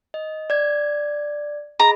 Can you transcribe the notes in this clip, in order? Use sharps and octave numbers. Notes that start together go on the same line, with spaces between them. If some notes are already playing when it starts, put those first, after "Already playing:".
D#5
D5 G#6
G#4 D#5 A#5 B5